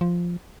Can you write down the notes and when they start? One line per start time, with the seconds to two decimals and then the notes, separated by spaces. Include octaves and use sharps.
0.01 F3